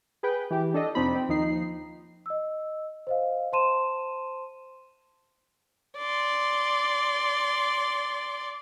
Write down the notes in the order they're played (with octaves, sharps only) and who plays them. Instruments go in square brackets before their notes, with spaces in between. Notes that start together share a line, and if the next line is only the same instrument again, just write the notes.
[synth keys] G#4 B4 G5
E3 G4
D4 A4 D#5
F2 C3 C4 D4 D#4 B5
C4
D#2 F3 D#4 C7
[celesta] D#5 E6
C5 D#5 F5
C5 A5 C6 D#7 E7
[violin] D5 C6